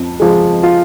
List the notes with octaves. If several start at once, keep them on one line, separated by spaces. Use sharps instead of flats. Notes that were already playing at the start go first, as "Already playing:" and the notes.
Already playing: F2 F3
F3 G#3
F4